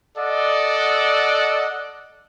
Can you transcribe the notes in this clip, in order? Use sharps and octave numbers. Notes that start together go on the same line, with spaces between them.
A4 D5 D#5 F#5